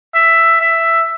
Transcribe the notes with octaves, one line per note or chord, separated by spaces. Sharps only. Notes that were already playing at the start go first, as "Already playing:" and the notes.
E5
E5